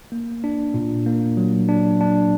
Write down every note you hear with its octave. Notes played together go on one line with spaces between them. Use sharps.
A#3
D4
A#2
A#3
F#3
D4
D4